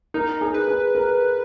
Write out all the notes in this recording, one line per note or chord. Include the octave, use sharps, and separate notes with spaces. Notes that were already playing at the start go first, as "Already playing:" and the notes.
D#4 A#4
G#4
B4
G#4
A#4